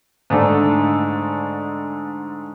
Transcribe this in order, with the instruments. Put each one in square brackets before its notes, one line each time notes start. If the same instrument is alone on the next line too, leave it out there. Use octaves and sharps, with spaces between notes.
[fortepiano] G#2 D3 A3 D4